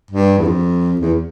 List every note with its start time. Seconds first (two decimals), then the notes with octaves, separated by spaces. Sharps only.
0.11 G2
0.38 E2
0.46 F2
1.01 E2